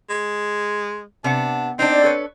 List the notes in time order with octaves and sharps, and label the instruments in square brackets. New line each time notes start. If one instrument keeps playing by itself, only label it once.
[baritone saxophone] G#3
[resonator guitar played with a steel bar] C3 B3 F#5 [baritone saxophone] D4
[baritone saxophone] C4 [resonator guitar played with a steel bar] D4 D#4
[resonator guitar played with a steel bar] A4 B4 C#5